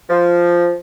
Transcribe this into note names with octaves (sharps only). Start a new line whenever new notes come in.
F3